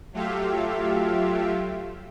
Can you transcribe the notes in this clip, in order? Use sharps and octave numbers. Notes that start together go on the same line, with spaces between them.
F#3 A3 F4 G4 E5 F5